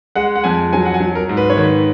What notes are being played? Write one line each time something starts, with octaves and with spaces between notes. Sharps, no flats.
G#3 F#5
F#5
F2 G#5
F#3 G#5
F#5
G#5
F#3
A#4
G#2
B4
C#5
D#3
B4